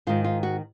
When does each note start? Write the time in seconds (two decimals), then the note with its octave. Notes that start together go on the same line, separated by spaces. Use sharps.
0.07 G#2 D#3 F4
0.24 F4
0.43 F#4